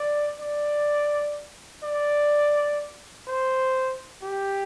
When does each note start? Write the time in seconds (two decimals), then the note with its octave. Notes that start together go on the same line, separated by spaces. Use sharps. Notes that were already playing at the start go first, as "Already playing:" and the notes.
Already playing: D5
0.40 D5
1.83 D5
3.28 C5
4.23 G4